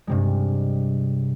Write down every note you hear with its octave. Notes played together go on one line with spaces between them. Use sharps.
G2 C3 G#3